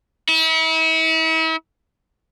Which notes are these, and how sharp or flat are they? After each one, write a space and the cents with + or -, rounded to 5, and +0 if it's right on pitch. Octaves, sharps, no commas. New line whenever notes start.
E4 -40